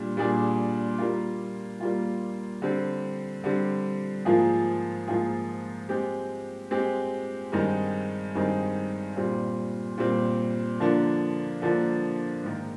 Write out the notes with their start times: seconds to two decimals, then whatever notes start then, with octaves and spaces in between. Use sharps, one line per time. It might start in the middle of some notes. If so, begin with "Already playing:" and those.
Already playing: A#2 G3 D4
0.17 A#2 G3 D4 G#4 D5
0.98 G3 A#3 F4
1.80 G3 A#3 F4
2.62 D3 G3 C4
3.44 D3 G3 C4
4.25 G#2 F3 A#3 F4 G#4
5.08 G#2 F3 A#3 F4 G#4
5.89 G#3 C4 G4
6.71 G#3 C4 G4
7.52 G2 D#3 G#3 C4 D#4
8.35 G2 D#3 G#3 C4 D#4
9.16 A#2 G3 C4
9.98 A#2 G3 C4
10.80 D3 F3 A#3 D4
11.62 D3 F3 A#3 D4
12.43 G#2 D#3 A#3